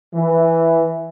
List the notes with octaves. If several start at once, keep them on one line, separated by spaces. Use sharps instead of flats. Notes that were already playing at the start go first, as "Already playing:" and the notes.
E3